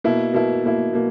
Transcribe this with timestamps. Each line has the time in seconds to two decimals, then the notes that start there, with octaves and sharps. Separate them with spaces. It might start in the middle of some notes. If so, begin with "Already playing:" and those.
0.04 B2 A#3 E4
0.34 B2 A#3 E4
0.64 B2 A#3 E4
0.93 B2 A#3